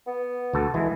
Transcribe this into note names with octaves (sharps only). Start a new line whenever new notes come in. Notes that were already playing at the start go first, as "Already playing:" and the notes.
B3
D2 A4
E3 G#3